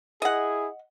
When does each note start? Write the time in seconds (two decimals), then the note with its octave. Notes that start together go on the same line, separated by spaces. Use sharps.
0.22 E4 G#4 D#5 F#5